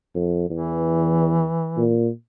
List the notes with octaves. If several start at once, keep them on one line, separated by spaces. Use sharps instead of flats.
F2
E2 E3
A#2